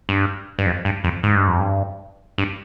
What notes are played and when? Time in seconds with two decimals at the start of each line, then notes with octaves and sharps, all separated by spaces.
0.09 G2
0.59 G2
0.66 F2
0.85 G2
1.04 F2
1.23 G#2
1.35 G2
1.48 F2
1.60 G2
2.38 G2